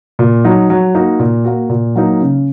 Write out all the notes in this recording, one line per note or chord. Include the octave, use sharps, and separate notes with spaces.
A#2
F#3 D#4
F#3
A#3 D#4 F#4
A#2
A#3 F#4
A#2
F#3 A#3 D#4
C#3